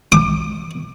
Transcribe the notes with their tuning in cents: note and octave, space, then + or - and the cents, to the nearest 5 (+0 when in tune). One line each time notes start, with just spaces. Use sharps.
D6 +30